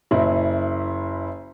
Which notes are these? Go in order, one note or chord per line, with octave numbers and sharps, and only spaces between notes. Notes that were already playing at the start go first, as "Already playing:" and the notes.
F#1 E4